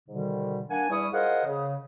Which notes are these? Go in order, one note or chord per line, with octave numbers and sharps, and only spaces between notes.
G#2 B2 D3 D#3 G3
A#3 D4 F#5 G#5
E2 G3 E4 C#6 D#6
F4 G#4 A#4 C5 D#5 F#5
C#3